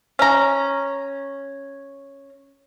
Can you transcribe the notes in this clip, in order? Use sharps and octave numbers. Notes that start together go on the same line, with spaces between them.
C#4 A#5